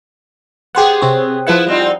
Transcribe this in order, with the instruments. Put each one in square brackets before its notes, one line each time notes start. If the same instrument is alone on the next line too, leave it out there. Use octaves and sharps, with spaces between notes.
[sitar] B3 G#4 [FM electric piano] G4 C5 F#5
[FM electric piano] C3 C4 C#5
[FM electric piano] F3 F#5 [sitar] B3 E4 B4
[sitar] G3 C4 D#4